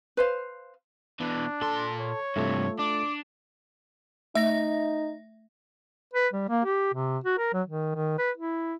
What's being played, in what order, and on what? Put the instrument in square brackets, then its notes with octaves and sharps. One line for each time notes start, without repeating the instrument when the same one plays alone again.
[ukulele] B4 C5 F5
[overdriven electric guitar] B2 E3 [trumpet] D4
[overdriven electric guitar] A#2 C6 [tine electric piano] A4 A5
[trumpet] C#5
[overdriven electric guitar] G2 C3 [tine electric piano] A3 F4 A4
[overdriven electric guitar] D4 [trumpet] D6
[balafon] A3 [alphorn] D#4 [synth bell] E5 A#6
[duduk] B4
G3
A#3
G4
C3
F#4
A#4
F#3
D#3
D#3
B4
E4